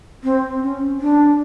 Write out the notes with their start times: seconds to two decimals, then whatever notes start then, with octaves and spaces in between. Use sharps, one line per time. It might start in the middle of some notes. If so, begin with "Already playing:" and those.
0.24 C4
0.62 C#4
1.01 D4